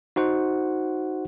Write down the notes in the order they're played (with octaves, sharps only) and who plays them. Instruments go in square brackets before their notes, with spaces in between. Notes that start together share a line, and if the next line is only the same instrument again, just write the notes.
[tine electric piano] D#4 F#4 C5 F#5